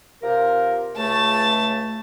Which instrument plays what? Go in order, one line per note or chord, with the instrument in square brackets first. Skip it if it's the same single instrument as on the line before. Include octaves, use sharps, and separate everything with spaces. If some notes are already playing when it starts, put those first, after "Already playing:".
[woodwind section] C3 F4 A#4
[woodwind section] C#2 A3 [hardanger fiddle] A5